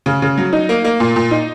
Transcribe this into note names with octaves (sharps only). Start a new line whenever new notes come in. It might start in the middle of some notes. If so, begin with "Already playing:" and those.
C#3
C#3
F#3
D#4
A#3
A#3
A#2
A#2
D#4